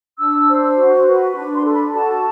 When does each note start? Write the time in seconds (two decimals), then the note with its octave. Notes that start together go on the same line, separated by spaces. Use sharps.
0.18 D4 E6
0.48 C5
0.77 F#4
1.06 B4
1.36 D4
1.55 C6
1.65 A4
1.74 B5
1.93 F#4 A5